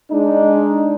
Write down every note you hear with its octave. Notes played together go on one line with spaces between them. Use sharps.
G#3 D4 D#4